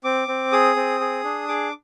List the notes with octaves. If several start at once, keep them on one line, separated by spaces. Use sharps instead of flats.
C4 D6
C4
G#4 D#6
C4
G#4
D4
G#4 D6